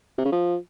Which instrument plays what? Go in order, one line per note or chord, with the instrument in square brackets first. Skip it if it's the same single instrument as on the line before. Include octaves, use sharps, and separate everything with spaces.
[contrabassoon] C3
C#3
F3